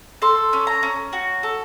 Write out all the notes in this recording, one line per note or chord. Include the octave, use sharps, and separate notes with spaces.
A4 C6
C#4
A#5
C#4
F#4
A4